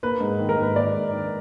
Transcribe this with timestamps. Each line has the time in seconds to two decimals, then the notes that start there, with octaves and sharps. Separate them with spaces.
0.03 A#3 B4
0.21 G#2
0.39 D#3
0.49 A#4
0.57 G#2
0.62 B4
0.76 A#3 D5
0.94 G#2
1.12 D#3